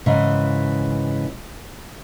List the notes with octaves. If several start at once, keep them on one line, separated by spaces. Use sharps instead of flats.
G#2 C#3 E3